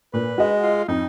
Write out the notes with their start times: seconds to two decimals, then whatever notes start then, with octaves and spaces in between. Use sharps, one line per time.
0.14 A#2 B4
0.38 G#3 F#4 D#5
0.63 F4
0.88 F2 D#4